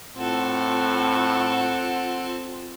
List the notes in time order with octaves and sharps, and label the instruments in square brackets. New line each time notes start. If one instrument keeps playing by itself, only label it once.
[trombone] A2 [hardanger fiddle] C4 A4 [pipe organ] F4 [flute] F#5